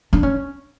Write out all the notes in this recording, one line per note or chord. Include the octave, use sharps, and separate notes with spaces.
D4
C#4